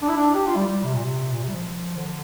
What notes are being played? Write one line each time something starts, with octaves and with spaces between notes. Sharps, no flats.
D4
E4
D4
G4
F4
G3
G3
C3
A#2
C3
A#2
C3
G3
F3
D3